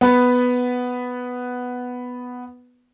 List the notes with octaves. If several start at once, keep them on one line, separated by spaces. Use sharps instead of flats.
B3 B4